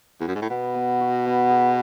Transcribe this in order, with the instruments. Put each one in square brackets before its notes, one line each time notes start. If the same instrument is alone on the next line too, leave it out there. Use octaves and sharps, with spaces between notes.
[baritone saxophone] E2
F#2
G#2
A2
[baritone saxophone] B2 [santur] B3
[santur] B3
F#4
B3
G#4